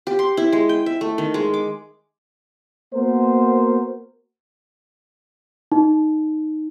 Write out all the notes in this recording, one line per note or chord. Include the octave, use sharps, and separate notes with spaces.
G4
C6
E4
G#3
G5
E5
A3
D#3
G#3
D6
A#3 B3 F#4 A#4 C5
D#4